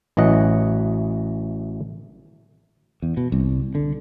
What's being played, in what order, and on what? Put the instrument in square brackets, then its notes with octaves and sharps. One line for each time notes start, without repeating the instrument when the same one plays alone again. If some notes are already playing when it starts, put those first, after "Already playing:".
[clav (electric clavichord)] A1 E3 F#3 D#5 F#5
[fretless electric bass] E2
B2
C2
D3